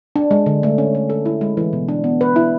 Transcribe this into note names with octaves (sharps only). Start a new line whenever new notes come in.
D4
G#3
D3
A3
C#4
A3
A4
E4
G#3
E3
B2
D4
B3
B4
E4